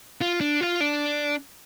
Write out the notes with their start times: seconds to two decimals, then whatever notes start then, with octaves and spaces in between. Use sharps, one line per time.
0.21 F4
0.41 D4
0.61 F4
0.81 D4